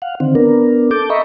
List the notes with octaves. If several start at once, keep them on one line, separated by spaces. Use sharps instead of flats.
F5 F#5
D3 D#3 C4
B3 D4 A#4
A4 A5 D6 G6
D#5 E5 A#5 B5 C#6